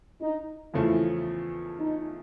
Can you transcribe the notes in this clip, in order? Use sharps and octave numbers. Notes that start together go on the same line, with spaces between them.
D#4
E2 C#3 F3 A3 E4
D#4